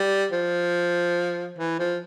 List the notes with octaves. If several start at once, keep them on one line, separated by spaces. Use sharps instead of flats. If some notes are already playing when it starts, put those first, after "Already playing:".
Already playing: G3
F3
E3
F3